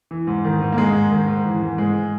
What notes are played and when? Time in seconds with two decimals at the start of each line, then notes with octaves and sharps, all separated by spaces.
0.11 E3
0.27 G#2
0.45 D#3
0.61 G#2
0.72 A#3
0.78 G#2 G#3
0.94 G#2
1.11 D#3
1.28 G#2
1.45 E3
1.62 G#2
1.78 G#2 G#3